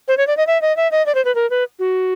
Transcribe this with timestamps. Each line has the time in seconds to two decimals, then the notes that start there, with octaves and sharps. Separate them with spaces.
0.08 C5
0.17 C#5
0.27 D5
0.37 D#5
0.47 E5
0.62 D#5
0.77 E5
0.91 D#5
1.06 D5
1.15 C5
1.25 B4
1.35 A#4
1.50 B4
1.79 F#4